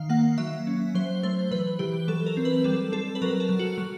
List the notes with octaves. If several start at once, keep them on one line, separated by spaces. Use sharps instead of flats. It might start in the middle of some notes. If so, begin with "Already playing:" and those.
Already playing: D#3 F5
A#3 F#5
F#3 E5
C#4
F#3 C5
A3 C5
E3 B4
E3 G4
F#3 A4
A#4
C4
B4
G3 A4
C4 A4
B4
F#3 A#4
A4
F#3
F#4
F#3